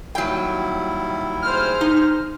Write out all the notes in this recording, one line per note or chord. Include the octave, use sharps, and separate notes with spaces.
D#2 F#3 G3 E4 G5
G#4 C5 F6
D#4